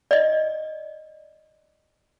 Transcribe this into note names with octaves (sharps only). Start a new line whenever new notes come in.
D5 D#5